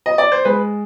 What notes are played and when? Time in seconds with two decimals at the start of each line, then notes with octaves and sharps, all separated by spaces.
0.06 D#5
0.18 D5
0.32 C5
0.45 G#3 B4